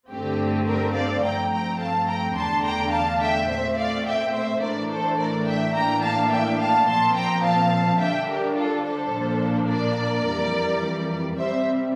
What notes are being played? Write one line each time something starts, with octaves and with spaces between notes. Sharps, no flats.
G2 D3 A3 C4 G4
G4 A#4
D5 F5
G2 F3 A3 C4 G5 A#5
G5 A#5
F5 A5
G5 A#5
E2 D3 A3 D4 A5 C6
G5 A#5
F5 A5
E5 G5
A#2 A3 C4 C5 E5
D5 F5
E5 G5
C5 E5
A2 E3 A3 D4 A#4 D5
A4 C5
A#4 D5
E5 G5
A2 E3 A#3 D4 G5 A#5
F5 A5
E5 G5
F5 A5
A#2 F3 C4 A5 C6
G5 A#5
F5 A5
D3 G3 D4 E5 G5
G4 A#4
F4 A4
A4 C5
A#2 F3 A#3 D4
A#4 D5
F2 E3 G3
C3 G3 C4 C5 E5